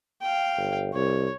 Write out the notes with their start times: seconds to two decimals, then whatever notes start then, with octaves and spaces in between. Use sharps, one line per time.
0.22 F5 G5
0.57 G1
0.94 C2 C#5